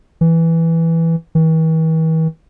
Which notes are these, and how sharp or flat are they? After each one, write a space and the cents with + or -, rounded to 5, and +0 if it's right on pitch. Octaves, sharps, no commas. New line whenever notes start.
E3 +0
E3 -45